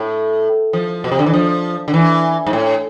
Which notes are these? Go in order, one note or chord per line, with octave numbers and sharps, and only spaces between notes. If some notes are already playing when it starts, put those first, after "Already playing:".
Already playing: A2
F3
B2
C3
D3
E3
F3
D3
E3
G#2
A2